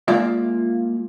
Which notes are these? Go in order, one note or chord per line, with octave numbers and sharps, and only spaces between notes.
G#3 A#3 F4 D5 E5